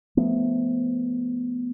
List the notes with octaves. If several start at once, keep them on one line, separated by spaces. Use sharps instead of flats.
F3 A3 B3